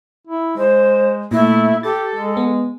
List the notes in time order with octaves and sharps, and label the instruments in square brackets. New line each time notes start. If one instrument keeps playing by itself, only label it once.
[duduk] E4
[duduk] G#3 [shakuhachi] C5
[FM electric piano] A#2 [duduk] A3 [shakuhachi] E4
[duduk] G4 [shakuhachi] A4 [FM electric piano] A6
[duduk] G#3
[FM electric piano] B3